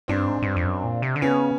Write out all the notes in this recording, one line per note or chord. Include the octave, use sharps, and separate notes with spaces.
G2 C4 D4
G#2
G#2
G2
F2
F#2
A#2
C3
D3
C#3 B3 C#4